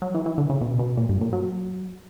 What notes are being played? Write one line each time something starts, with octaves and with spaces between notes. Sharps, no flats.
F#3
E3
E3
D3
C#3
B2
B2
A#2
G2
A#2
F#3